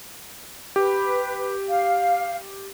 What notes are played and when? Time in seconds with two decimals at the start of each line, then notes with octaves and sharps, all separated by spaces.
0.76 G4 B4
1.67 F5